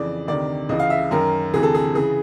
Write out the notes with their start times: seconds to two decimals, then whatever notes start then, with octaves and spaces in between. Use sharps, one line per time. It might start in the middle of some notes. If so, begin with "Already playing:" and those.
Already playing: F2 C#3 E3 D5
0.27 D2 C3 D#3 D5
0.69 C#2 C#3 E3 D#5
0.80 F5
0.90 E5
1.11 F#2 D#3 A#4
1.53 D2 C3 E3 G#4
1.63 A4
1.74 G#4
1.95 C#3 E3 G#4